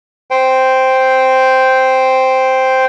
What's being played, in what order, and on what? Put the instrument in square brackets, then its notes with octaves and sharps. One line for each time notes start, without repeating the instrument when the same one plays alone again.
[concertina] C5 G5